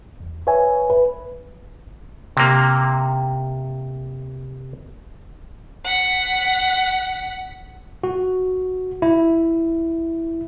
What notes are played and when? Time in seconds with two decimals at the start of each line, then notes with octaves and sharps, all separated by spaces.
0.20 E2
0.47 B4 C#5 E5 G#5
0.90 B4
2.37 C3 A#3
5.84 F#5 B6
8.04 F#4
9.02 E4